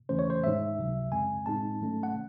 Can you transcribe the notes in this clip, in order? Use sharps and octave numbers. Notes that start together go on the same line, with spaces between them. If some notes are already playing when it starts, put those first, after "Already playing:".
E2 C#3 E3 A3 C#4 C5
C#5
C5
G#2 D#3 G#3 D#4 E5
C#2 C3 F#3
F#2 C#3 G#3 C4 G#5
A2 G#3 C4 D#4 A5
G#2 D#3 F#3 A3 C#4
F#5